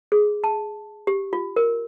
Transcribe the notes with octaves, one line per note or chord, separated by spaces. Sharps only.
G#4
A5
G4
F4
A#4